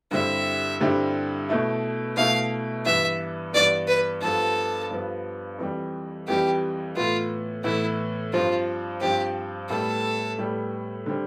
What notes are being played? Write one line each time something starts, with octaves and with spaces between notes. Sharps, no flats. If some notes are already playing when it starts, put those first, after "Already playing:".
G2 D3 G3 C4 E4 E5
G2 D3 G3 C4 E4
B2 A3 E4
B2 A3 E4 F5
G2 E3 B3 E5
G2 E3 B3 D5
B4
G2 F3 B3 A4
G2 F3 B3
F2 E3 G3
F2 E3 G3 G4
A2 E3 B3 F4
A2 E3 B3 E4
G2 F3 C4 F4
G2 F3 C4 G4
A2 G3 B3 A4
A2 G3 B3
D3 G3 C4